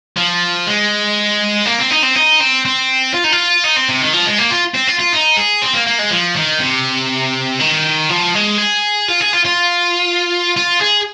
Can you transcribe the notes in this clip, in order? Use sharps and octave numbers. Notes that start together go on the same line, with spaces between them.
F3
G#3
A#3
C4
D#4
C4
D#4
C4
C4
F4
D#4
F4
D#4
C4
C3
D#3
F3
G#3
A#3
F4
C4
F4
F4
D#4
G#4
C4
A#3
A#3
G#3
F3
D#3
C3
D#3
F3
G#3
G#4
F4
G#4
F4
F4
F4
G#4